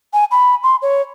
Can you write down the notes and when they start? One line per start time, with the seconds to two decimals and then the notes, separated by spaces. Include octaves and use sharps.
0.13 G#5
0.31 B5
0.63 C6
0.82 C#5